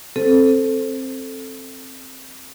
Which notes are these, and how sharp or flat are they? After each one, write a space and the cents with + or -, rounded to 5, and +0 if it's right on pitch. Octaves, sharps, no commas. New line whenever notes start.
C4 +15 A4 +0 C5 +0